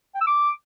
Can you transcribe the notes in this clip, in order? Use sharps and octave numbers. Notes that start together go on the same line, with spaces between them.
G5
E6
D6